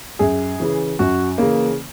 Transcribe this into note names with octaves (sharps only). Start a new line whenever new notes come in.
F#2 G#4
C#3 E3
F#2 F#4
C#3 E3 A#3